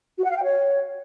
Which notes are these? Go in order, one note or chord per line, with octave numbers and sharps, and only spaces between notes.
F#4
F#5
F5
G5
C#5